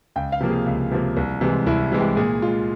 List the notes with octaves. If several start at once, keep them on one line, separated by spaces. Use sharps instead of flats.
C#2 G5
F5
C3 F3 A#3
G#4
C#2
C3 F3 A#3
C2
C3 E3 G#3
C2 E4
C3 E3 G#3
G4
A#2 G#4
G#3 F4